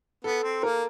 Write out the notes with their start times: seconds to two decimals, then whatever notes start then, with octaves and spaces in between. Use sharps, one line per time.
0.24 B3 A4
0.43 C4
0.63 A#3 A#4